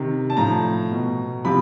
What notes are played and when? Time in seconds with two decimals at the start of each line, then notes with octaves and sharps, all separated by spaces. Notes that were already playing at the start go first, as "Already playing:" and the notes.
Already playing: C3 D#3
0.30 A5
0.37 A2 F3 A#5
0.91 B2
1.45 C3 F3 B5